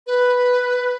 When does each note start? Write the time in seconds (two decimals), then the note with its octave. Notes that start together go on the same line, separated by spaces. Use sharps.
0.07 B4